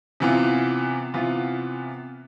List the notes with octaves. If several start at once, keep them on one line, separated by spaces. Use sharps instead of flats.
C3 E3 B3 F4
C3 E3 B3 F4